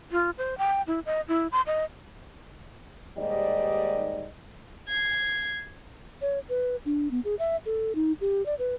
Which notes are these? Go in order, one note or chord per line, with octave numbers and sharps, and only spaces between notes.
F4
C5
G5
E4
D#5
E4
C6
D#5
D#2 G#2 G3 D5 D#5
G#6 C7
C#5
B4
D4
B3
G#4
E5
A4
D#4
G4
D5
B4